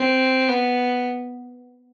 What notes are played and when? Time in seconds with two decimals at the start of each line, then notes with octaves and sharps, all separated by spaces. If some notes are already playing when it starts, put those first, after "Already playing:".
Already playing: C4
0.48 B3